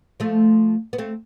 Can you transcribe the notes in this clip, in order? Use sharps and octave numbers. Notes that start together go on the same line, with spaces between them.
F3 A3
B3
A3 C4